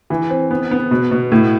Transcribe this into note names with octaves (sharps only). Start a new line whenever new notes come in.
E3
C4
B3
B3
B2
B2
A2